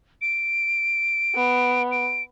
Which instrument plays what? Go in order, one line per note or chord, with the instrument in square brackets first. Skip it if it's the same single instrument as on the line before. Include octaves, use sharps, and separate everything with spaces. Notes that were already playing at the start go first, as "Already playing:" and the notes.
[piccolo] D7
[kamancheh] B3
[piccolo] D7